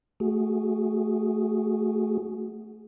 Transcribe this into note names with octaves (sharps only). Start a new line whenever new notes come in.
A3 F#4 G#4